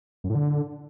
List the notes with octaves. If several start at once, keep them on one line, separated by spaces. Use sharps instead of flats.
F#2
A2
D3